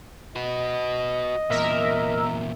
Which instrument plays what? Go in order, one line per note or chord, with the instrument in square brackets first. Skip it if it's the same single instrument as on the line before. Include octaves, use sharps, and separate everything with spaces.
[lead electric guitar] F#4 B4 [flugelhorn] D#5
[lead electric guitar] E2 A#2 [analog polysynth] A#4 E5